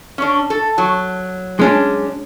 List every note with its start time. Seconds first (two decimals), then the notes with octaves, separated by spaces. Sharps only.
0.18 C#4 D4
0.50 A4
0.78 F#3
1.59 G#3 C#4 D4